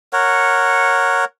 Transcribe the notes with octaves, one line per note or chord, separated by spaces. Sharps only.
A#4 C#5 F#5